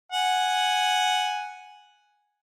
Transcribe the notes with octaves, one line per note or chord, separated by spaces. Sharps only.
F#5 G#5